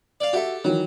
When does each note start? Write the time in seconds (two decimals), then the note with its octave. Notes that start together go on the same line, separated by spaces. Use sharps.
0.20 D5 F5
0.33 F#4 G4 A4 E5
0.65 D#3 E3 F#3